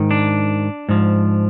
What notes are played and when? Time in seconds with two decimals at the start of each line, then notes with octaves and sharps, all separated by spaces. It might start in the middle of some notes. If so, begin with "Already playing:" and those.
Already playing: G#2 D#3
0.11 D4
0.89 G#2 F3